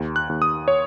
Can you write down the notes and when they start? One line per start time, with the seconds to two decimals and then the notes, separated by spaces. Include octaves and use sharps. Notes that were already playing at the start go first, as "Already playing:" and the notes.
Already playing: D#2
0.16 F#6
0.29 D#2
0.42 D#6
0.68 C#5